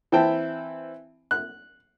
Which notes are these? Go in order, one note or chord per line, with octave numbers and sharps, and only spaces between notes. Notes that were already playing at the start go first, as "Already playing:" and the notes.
E3 C4 E4 G5 A5
F#6